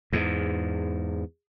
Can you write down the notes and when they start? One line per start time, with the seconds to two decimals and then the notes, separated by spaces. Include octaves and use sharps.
0.13 E2 G#2